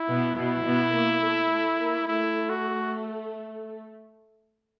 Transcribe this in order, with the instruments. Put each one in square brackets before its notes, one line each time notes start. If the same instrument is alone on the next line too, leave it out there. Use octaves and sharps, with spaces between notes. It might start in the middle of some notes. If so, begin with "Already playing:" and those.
Already playing: [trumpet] E4
[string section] B2 B3
[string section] B2 B3 [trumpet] E4
[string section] B2 B3
A#3
A3
A3
A#3
[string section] A3 [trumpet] E4
[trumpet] F#4